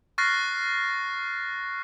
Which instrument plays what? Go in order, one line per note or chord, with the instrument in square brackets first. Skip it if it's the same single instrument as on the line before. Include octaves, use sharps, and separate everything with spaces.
[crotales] C#6 F6 F#6 A6 A#6 C7